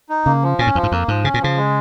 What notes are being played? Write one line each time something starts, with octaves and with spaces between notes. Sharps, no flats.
D#4
C#3 A#3
F3
A#2 C#4
G#2
F2 F3
G#2
F2 A#3
G#2 F3
C#3 C#4
A#2
C#3 F3
G#3